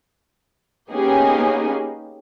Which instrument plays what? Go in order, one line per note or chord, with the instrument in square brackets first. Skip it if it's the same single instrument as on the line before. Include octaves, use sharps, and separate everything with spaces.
[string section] A#3 B3 C#4 D#4 G4 G#4